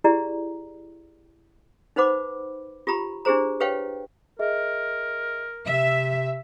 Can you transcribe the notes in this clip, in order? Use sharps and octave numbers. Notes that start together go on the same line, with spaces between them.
E4 G4 G#4 D5 A#5
D#4 B4 C5 F#5 B5 D6
F4 G4 A#5 B5
D4 E4 G4 G#4 C5 A#5
G4 B4 C#5 F5 G5
G#4 A#4 D#5 E5
C3 E5 F6